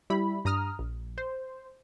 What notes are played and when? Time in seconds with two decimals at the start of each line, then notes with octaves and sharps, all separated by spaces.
0.10 G3 E4 B5
0.45 G2 A#5 D#6 F6
0.79 A#1
1.18 C5